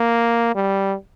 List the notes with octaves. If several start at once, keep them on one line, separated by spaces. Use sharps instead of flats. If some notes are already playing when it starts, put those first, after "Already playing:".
Already playing: A#3
G3